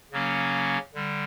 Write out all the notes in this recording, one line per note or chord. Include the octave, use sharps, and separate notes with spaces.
C#3 F#3 A#3 C#4
D3 G3